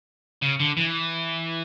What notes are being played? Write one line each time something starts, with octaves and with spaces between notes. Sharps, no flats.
C#3
D3
E3